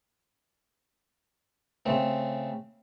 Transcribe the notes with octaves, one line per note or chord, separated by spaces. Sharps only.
C#3 A3 C4